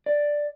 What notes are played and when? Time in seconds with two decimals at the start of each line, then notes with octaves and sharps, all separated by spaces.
0.06 D5